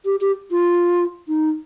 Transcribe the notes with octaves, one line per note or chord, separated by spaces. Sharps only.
G4
G4
F4
D#4